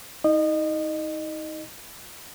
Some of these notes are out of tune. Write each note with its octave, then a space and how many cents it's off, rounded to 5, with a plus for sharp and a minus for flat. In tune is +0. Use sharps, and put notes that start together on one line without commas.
D#4 +35 D#5 -25